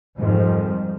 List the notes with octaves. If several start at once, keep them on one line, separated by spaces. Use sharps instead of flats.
F2 G#2 D#3 F3 G3